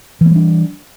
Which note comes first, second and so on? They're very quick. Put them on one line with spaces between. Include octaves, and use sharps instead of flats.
E3 A#3 G3 D4